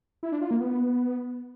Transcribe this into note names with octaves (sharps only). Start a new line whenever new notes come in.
E4
D4
F4
A#3
B3